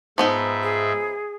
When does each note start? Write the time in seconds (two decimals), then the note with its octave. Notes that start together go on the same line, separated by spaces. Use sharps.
0.18 G#2 F3 B3 D#4 E5
0.63 G#4